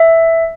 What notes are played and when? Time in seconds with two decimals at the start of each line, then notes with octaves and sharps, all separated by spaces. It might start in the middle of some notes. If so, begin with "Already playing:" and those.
Already playing: E5